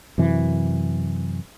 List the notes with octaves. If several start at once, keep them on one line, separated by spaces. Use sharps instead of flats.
F#2 C3 E3